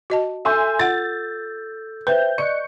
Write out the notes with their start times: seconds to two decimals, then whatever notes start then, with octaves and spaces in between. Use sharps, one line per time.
0.10 F#4 D#5 A5
0.45 A4 E5 G#5 C6 E6 G6
0.79 F4 F#5 A6
2.07 B4 C5 E5 G5 G6
2.38 D5 D#5 C#6 F#6 C#7